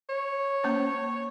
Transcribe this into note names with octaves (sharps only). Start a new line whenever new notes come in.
C#5
A#3 C#4 C5